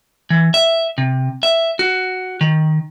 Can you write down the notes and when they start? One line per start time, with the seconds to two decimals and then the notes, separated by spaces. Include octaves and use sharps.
0.30 E3
0.54 E5
0.98 C3
1.43 E5
1.79 F#4
2.41 D#3